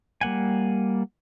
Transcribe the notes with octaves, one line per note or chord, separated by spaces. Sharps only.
G3 A#3 F#5 G#5